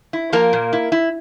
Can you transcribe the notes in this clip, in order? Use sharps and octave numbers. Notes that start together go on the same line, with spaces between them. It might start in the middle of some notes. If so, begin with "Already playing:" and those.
E4
F3 A#3 A#4
A#2
E4
E4